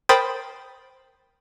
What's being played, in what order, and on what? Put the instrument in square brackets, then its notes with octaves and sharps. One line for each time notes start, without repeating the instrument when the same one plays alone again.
[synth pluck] A#4 C5 G5 B5 D#6 A6